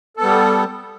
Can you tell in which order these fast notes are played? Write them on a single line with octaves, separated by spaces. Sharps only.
A4 B3 G3